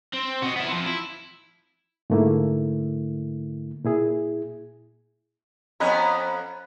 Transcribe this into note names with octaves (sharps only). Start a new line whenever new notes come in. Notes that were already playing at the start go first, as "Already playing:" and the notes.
C4
F#4 D#5
B3 E4
F3 C4
E4
G#2 D3 A3 A#3 E4
A#2 E4 G#4
F2 B3 C#4 C#5 D#5 A#5 B5 F#6